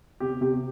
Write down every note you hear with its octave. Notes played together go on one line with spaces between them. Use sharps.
C3 G4
C3 G4